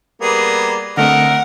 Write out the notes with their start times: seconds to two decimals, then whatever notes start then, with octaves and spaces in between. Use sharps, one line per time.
0.22 G3 A#3 B3 G#4
0.97 D3 A3 C4 A#4 D#5 E5 F#5